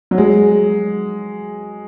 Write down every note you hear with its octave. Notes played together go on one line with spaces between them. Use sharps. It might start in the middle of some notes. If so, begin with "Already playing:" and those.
F#3
G#3